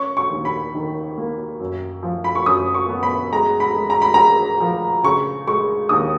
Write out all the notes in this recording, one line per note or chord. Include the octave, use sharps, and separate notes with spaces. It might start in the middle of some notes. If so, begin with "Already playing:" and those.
Already playing: C#4 C#6
C#6
D#2
B5
D#3
A#3
F#2
F3
B5
C#6
F#2 D#6
C#6
B3
B5
G#3 A#5
B5
G#3
A#5
B5
G#3 A#5
F3
C#3 C#6
G#3 C#6
D#2 D#6